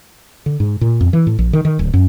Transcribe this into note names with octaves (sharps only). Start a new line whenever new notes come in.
D3
G#2
A#2
F2
E3
A2
A#1
D#3
D#3
D1
F#2